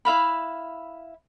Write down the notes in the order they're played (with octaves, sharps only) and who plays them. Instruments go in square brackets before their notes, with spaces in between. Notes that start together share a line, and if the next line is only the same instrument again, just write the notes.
[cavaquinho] E4 E5 F5 B5